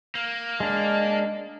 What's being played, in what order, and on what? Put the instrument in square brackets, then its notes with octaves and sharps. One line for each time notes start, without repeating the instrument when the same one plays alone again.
[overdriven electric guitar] A#3
[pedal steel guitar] G#3 D4 [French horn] D#5